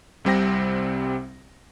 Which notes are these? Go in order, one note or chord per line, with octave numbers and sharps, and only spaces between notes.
C2 C3 G3 C4 G5 A#6